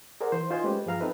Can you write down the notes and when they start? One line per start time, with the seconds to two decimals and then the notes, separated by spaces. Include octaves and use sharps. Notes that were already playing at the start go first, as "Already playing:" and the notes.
0.21 G#4 A#4 C5 D5 F#5
0.32 E3 C5
0.50 D#4 F4 C5 D#5 G#5
0.64 G#3 A3 C#4 G4 B4
0.86 G2 F3 G#4 F5 A#5 F6
1.00 C4 D#4 A4 B4 E5